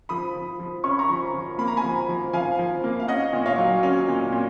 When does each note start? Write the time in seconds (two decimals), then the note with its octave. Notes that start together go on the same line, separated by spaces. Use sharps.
0.09 F3 B5 D#6
0.34 F3
0.60 F3
0.84 C#4 C#6
0.91 B5
0.99 A#5 C#6
1.10 F3
1.34 F3
1.58 A#3 B5
1.68 A#5
1.77 G#5 B5
1.84 F3
2.09 F3
2.33 F3 F5 G#5
2.59 F3
2.84 A#3
3.00 F5
3.08 C#4 D#5 F#5
3.33 A#2
3.46 C#5 F5
3.58 F#3
3.83 C#4
4.08 A#2
4.32 A#2